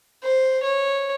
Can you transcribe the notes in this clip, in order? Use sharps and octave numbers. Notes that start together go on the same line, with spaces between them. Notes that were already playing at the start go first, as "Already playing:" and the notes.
C5
C#5